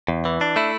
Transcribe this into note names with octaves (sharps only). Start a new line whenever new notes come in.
E2
E3
D4
A3 E4